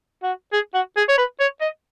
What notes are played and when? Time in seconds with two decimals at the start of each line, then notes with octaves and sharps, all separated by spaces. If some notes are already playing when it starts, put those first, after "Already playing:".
0.23 F#4
0.53 G#4
0.74 F#4
0.96 G#4
1.08 C#5
1.17 B4
1.40 C#5
1.61 D#5